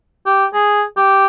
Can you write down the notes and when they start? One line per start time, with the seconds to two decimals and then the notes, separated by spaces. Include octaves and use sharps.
0.26 G4
0.54 G#4
0.97 G4